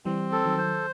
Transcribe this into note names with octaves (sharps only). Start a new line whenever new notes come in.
E3 G3 C4
A4
D#3 F#3
C5